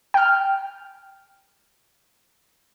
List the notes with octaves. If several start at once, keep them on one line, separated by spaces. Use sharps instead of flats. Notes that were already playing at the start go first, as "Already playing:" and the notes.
G5 F6